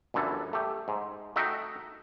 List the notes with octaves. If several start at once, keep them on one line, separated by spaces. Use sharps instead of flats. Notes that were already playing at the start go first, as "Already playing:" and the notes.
G1 F#2 D3 E3 A4
A3 G4
G#2
A3 D#4 F#4 E5 G5